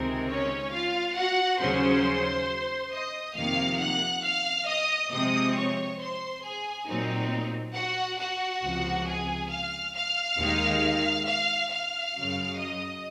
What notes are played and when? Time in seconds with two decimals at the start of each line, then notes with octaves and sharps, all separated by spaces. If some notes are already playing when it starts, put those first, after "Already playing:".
Already playing: C#2 C3 D#3 G#3 C4 A#4
0.28 C#4 C#5
0.71 F4 F5
1.15 F#4 F#5
1.59 D#2 C#3 F#3 C#4 C5 C6
2.92 D#5 D#6
3.35 F2 C3 D#3 A#3 F5 F6
3.80 F#5 F#6
4.23 F5 F6
4.67 D#5 D#6
5.11 C3 F3 G#3 C4 D#5 D#6
5.55 C#5 C#6
5.99 C5 C6
6.43 G#4 G#5
6.87 A#2 F#3 C4 D#4
7.75 F#4 F#5
8.18 F#4 F#5
8.63 C#2 C3 F3
9.07 G#4 G#5
9.51 F5 F6
9.95 F5 F6
10.39 D#2 D#3 G#3 D#4
11.26 F5 F6
11.70 F5 F6
12.15 F#2 C#3 F#3
12.58 D#5 D#6